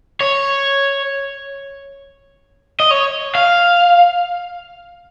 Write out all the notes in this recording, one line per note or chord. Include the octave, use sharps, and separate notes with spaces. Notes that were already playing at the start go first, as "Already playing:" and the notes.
C#5
D#5
C#5
F5